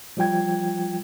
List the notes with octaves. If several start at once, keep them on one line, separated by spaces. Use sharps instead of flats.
F3 G3 F4 G5 G#6